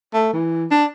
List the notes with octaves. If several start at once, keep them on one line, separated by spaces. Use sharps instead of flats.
A3
E3
D4